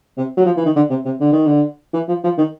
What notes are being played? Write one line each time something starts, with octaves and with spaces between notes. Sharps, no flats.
C3
F#3
F3
E3
D#3
D3
C3
C3
D3
D#3
D3
E3
F3
F3
D#3